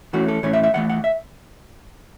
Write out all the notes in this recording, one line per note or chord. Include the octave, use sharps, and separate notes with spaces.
E3 A3 C#4 F#4
A4
A2 E3 A3 C#4 C#5
E5
E5
A2 E3 A3 F#5
F#5
E5